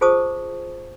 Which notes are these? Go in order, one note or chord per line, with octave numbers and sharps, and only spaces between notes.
F4 G#4 C5 A5 C#6 D#6